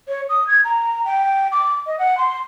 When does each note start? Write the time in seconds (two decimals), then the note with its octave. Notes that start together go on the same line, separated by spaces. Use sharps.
0.08 C#5
0.30 D#6
0.47 G#6
0.64 A#5
1.05 G5
1.52 D6
1.86 D#5
1.99 F#5
2.18 C6